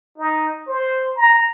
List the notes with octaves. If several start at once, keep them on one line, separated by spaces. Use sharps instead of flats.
D#4
C5
A#5